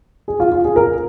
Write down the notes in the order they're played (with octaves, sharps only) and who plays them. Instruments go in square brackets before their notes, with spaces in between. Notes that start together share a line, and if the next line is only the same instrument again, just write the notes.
[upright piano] G#4
F4
F4
G#4
A#4